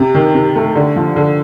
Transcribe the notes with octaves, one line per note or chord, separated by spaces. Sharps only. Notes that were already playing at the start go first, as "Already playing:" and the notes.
Already playing: C3
D#3
C3
A3
D3
F3
D3